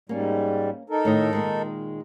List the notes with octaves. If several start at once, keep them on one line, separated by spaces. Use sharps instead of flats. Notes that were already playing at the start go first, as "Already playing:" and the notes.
G#2 G3 A#3 C#4
D#4 A4 A#4
A2 D#3 D#5
A#2 D#3 G#3